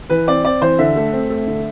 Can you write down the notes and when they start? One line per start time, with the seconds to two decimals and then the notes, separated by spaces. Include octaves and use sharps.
0.10 E3 B4
0.27 C4 D5
0.44 C4 D5
0.62 E3 C5
0.79 D3 E5
0.96 A3
1.13 C4
1.30 A3
1.47 D3